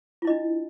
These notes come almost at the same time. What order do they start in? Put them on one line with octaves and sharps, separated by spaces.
F4 E4 D#5 D4